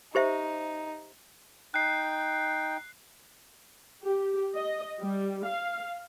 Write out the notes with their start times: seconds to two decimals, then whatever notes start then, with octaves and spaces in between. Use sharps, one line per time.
0.15 D#4 G4 C5 E5
1.74 D#4 G5 F#6 C7
4.04 G4
4.55 D#5
4.99 G3
5.45 F5